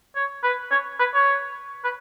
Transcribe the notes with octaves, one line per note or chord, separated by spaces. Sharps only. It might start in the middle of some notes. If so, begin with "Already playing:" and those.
C#5
B4
C#5
B4
C#5
B4